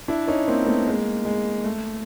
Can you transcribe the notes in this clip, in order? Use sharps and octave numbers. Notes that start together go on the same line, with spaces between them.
D4 E4
C#4 D#4
A#3 C4
A3 B3
G#3 A#3
G#3
A3